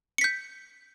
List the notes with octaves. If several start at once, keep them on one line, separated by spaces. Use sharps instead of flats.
G6 B6 C#7